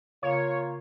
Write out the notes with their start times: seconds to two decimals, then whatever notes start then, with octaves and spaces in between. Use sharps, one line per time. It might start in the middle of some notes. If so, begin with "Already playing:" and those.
0.23 C#3 A#3 F4 C#5